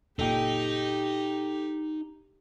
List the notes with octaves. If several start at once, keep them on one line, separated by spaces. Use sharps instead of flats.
F#1 A#2 A#3 D#4 G4 A4 G5